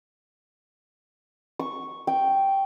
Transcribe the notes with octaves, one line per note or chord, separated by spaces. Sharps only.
C#6
G5